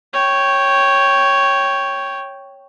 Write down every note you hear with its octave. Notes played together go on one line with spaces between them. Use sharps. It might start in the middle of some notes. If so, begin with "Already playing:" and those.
C#5 G5